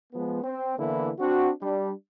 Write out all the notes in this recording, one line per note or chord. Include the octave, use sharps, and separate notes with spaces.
F3 G#3 B3
C4
D3 E3 A#3 B3 E4
C4 D4 F#4
G3 D4